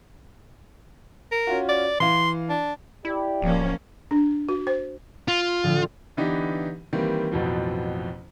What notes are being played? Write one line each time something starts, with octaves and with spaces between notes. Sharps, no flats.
A#4
C#4 F4 F#4
D5
E3 F5 C6
D4
E4 G4 D5
D1 F3 A#3 C#4
D4
F#4
C5
F4
A2 D3 F3
D3 E3 B3 D4 D#4 G4
D#3 E3 G3 A#3 C4
A1 F2 B2 F3 F#3